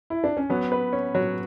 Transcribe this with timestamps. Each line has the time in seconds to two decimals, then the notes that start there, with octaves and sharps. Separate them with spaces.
0.10 E4
0.24 D4
0.37 C#4
0.50 F#3 B3
0.72 B4
0.93 C#4
1.15 F#3